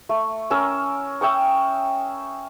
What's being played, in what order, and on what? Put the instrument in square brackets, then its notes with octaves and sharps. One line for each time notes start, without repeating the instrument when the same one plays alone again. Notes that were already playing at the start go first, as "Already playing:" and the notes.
[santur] A3
C#4 A#4 E6
E5 G5 C#6 D#6